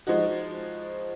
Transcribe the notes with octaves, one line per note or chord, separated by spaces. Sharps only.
F3 G#3 D#4 F#4